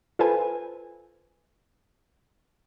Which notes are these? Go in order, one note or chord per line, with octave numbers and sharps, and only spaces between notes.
F4 A4 B4 C5 G#5